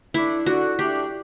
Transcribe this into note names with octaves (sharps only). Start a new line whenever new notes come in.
A3 D4 E4
D3 F#4
A3 D4 G4